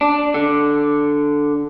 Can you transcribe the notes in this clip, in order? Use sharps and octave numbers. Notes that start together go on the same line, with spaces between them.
D4
D3